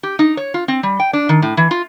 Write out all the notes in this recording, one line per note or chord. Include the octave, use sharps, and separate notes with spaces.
G4
D#4
C#5
F4
C4
G3
G5
D4
D#3
A2
E3
F4